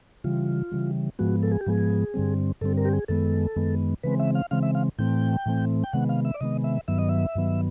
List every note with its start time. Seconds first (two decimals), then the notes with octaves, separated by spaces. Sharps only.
0.24 C#3 E3 G3 F4
0.71 C#3 E3 G3
1.19 G#2 F3 G#3 B3 F#4
1.43 A4
1.51 G#4
1.61 G4
1.66 G#2 F3 G#3 B3 G#4
2.14 G2 D3 G3 C4
2.61 G2 D3 G3 C4 A4
2.78 A#4
2.85 G4
2.93 G#4
3.08 F#2 D#3 G#3 B3 A4
3.56 F#2 D#3 G#3 B3
4.03 C#3 E3 G#3 C4 B4
4.19 E5
4.35 F5
4.51 C#3 E3 G#3 C4 F5
4.63 E5
4.75 F5
4.98 A2 E3 A3 C4 G5
5.46 A2 E3 A3 C4
5.84 G5
5.93 C3 D#3 G#3 B3 F#5
6.09 F5
6.25 E5
6.34 D5
6.41 C3 D#3 G#3 B3 D#5
6.64 E5
6.88 G2 D#3 F#3 B3 E5
6.99 D#5
7.09 E5
7.35 G2 D#3 F#3 B3